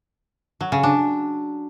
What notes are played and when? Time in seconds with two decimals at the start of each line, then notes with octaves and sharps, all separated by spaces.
0.61 F#3
0.72 C#3
0.83 D4